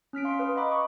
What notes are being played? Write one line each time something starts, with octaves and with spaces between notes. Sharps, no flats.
C#4 F6 B6 D7
F5 C6
B4 F5 D#6
D#5 F#5 A#5 B5 D6
F#5 C#6 D#6